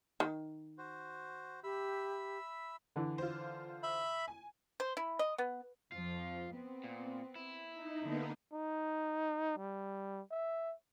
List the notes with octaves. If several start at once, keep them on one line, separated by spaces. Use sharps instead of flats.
D#3
F#4 C5
G4 E5 B5 E6
D3 E3
F4 C5
E5 B5
G#5
C5
E4
D#5
B3
F2 F3 F4
B3 C4
A#2
E4
D#4
D3 A#3 B3 D#4
D#4
G3
E5